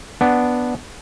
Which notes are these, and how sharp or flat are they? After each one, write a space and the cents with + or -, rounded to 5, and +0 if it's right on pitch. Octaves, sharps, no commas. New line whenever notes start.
B3 +0 D4 +0